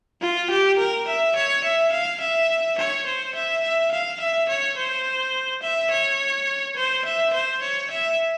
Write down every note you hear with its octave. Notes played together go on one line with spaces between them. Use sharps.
F4
G4
A#4
E5
C#5
E5
F5
E5
C#5
C5
E5
E5
F5
E5
C#5
C5
E5
C#5
C5
E5
C5
C#5
E5